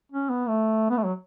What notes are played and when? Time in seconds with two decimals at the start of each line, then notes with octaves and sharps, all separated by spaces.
0.12 C#4
0.29 B3
0.48 A3
0.90 B3
0.97 A3
1.05 F#3